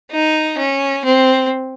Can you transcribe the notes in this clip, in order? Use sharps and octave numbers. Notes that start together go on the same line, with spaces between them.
D#4
C#4
C4